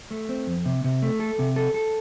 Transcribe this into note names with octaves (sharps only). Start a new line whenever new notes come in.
A3
C4
F2
C3
C3
A3
A4
C3
A4
A4